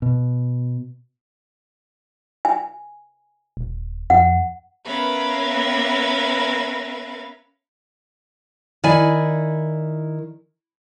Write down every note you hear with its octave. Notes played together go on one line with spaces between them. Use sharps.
B2
G#5
D#1
F2 F#5
B3 C#4 A#4 B4 E5 F5
D#3 E4 D5 G#5